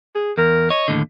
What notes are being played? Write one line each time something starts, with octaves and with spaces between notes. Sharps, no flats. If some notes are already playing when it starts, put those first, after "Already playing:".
G#4
E2 A#4
C#5 D#5
D#2 A2 D3